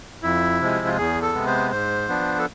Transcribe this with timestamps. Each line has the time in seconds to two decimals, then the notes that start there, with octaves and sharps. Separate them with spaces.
0.23 F2 E4
0.61 C3 F3 G#3
0.86 F4
0.97 E2 G#4
1.22 A4
1.34 C3 G#3 B3
1.47 C5
1.71 G#2 C5
2.09 F3 B3 D4
2.39 A4